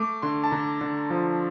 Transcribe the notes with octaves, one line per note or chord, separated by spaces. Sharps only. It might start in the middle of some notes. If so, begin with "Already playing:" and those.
Already playing: A3 D6
D3 C6
A5
D3 A#5
D3
F3